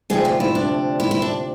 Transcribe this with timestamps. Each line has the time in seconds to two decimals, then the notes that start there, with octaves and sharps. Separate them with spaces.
0.10 D2 C3 F3 G#4
0.25 F4
0.40 E4
0.55 D4
1.00 E4
1.11 E4
1.22 D4